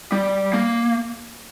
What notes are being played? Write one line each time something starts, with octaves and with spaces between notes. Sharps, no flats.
G3
A#3